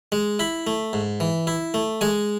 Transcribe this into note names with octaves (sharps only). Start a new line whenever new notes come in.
G#3
E4 B5
A3
G#2
E3
E4
A3
G#3 G#5